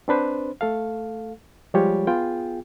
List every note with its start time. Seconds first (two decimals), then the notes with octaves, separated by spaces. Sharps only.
0.08 C4 D4 B4 C5
0.61 A3 A4 F5
1.74 F3 G3 G#3 F4 G4 C#5
2.07 B3 F4 G#4 G5